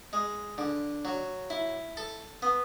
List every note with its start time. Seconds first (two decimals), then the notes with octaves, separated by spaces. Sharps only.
0.13 G#3
0.58 D3
1.05 F#3
1.50 E4
1.97 A4
2.42 B3